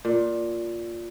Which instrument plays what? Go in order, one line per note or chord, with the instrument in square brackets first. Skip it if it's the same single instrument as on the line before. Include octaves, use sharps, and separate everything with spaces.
[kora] A#2